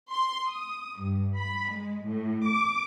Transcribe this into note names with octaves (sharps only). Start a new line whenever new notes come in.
C6
D#6
G2
B5
G#3
A2
D6